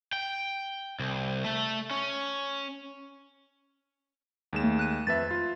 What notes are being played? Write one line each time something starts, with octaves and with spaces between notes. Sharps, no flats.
G5
C2
A3
C#4
D#2 G#3 E7
A3
F#6 D#7
F2 B4 E5 A6
F4